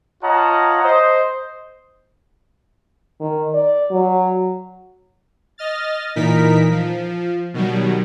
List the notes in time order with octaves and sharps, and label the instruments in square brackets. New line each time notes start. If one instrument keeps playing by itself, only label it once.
[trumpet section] F4 C#5 D#5 F#5 A5 A#5
C5 D#5
[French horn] D#3
D5
F#3
[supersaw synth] D#5 F6 A6
A#2 E3 D#4 A#4 B6
F3
B2 D#3 F#3 G3